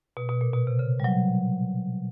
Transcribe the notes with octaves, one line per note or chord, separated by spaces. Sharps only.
B2
B2
A#2
B2
C3
C#3
G3
F#3